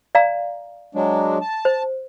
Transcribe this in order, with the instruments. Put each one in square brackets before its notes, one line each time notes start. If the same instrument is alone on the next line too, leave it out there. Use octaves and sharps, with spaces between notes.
[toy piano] D5 F5 A#5
[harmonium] F#3 G#3 D4
A5
[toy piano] C5